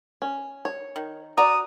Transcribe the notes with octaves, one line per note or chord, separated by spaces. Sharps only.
C#4
C#5
D#3
F#4 D5 A#5 D#6